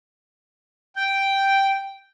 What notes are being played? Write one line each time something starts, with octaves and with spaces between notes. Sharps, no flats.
G5